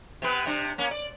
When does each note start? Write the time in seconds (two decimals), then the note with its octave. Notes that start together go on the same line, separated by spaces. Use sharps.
0.22 C3 B3 B4
0.46 C3 D4
0.78 A#3 C#4
0.91 D5